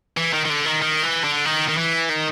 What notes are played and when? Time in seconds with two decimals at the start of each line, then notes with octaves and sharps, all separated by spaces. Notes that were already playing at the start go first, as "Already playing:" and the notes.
0.17 E3
0.33 D#3
0.45 D#3
0.50 D3
0.66 D#3
0.82 D#3
1.03 E3
1.24 D3
1.46 D#3
1.69 D#3
1.78 E3
2.10 D#3